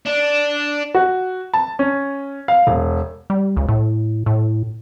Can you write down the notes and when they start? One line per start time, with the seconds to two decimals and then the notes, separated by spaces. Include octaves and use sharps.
0.06 D4
0.95 F#4
1.53 A5
1.79 C#4
2.48 F5
2.67 E1
3.30 G3
3.57 C#2
3.68 A2
4.26 A2